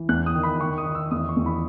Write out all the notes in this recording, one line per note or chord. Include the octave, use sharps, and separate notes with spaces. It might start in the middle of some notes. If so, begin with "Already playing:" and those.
Already playing: E3
E2 F#6
D#6
D#3
B5
D#3 C#6
D#6
D#3
E6
E2 D#6
C#6
E2
B5